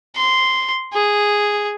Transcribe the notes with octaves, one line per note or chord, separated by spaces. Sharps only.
C6
G#4